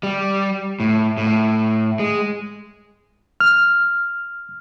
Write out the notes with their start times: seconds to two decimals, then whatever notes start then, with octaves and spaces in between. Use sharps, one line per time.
0.03 G3
0.80 A2
1.17 A2
1.99 G#3
3.40 F6